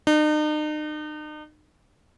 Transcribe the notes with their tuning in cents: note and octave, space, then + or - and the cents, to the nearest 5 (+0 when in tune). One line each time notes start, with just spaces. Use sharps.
D#4 -40